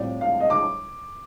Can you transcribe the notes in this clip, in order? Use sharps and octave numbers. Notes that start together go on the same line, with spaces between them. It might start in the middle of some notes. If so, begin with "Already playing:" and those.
Already playing: A2 G3 C4 F4 D5
F5
D#5
D6